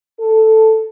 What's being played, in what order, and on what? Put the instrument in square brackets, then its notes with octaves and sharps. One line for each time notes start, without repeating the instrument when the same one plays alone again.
[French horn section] A4